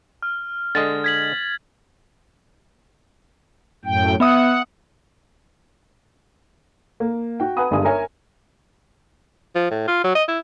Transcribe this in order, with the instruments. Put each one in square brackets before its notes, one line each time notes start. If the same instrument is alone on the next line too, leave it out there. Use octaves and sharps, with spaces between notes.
[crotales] F6
[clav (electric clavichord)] D3 G#3 D#5 [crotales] A6
[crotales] G#6 B6 F#7
[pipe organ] F#2 A2 G5
[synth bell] B3 E5 D#6 [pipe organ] F#5
[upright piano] A#3
F#4 G5
B4 F#5 G#5 A#5 B5 D#6
G1 G2 G#3 A#4 G#5 D#6
A#4 C#5 E5 G#5
[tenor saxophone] F3
A2
F4
F#3
D#5
E4